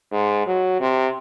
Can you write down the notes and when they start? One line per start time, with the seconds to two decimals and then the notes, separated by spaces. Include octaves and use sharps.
0.12 G#2
0.47 F#3
0.80 C3